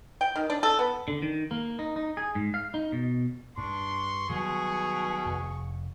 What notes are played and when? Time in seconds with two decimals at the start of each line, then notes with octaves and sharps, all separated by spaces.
0.21 G5
0.36 D#3
0.50 D4
0.63 A4
0.79 B3
1.08 D3
1.22 D#3
1.51 A#3
1.79 D#4
1.96 D#4
2.17 G#4
2.35 G#2
2.54 F5
2.74 D#4
2.92 B2
3.58 G2 D4 C6 C#6
4.30 B2 D#3 F#3 G3 G#4
5.26 F1